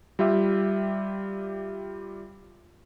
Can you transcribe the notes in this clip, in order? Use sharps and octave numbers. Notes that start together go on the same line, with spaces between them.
G3 F4 G4 E5